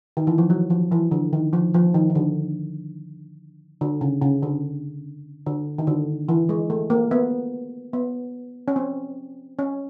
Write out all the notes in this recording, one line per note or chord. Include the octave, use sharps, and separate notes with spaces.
D#3
E3
F3
F#3
F3
E3
D3
D#3
F3
F3
D#3
D#3
D3
D3
C#3
C#3
D3
D3
D#3
D3
E3
G#3
A3
A#3
B3
B3
C#4
C4
C#4